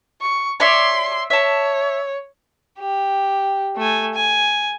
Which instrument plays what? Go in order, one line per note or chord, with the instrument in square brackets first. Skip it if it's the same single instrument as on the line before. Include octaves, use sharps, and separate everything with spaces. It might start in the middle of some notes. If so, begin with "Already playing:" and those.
[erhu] C#6
[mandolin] C#5 D5 E5 [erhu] C6
[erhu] C#5 [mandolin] E5 A5
[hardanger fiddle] G4
A3 G#5
G#5